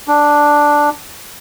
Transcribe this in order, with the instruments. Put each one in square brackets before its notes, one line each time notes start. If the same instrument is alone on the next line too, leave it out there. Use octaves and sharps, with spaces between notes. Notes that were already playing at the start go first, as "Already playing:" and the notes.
[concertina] D4